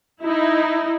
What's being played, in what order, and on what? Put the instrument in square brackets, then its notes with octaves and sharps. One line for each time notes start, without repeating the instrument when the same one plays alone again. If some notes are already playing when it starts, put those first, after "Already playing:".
[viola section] D#4 E4